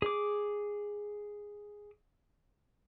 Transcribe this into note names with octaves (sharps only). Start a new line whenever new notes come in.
G#4 D6